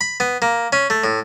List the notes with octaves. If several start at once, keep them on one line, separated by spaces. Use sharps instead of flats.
B5
B3
A#3
C#4
A3
A2